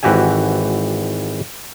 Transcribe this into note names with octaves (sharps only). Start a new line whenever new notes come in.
G#1 E3 F#4 G4 E5 G#5